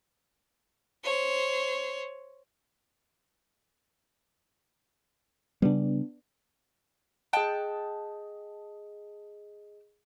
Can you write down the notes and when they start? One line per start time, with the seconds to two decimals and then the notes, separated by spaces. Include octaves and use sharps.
1.04 C5 C#5
5.62 C#3 G3 B3 D4
7.33 G#4 D#5 G5 A5 F#6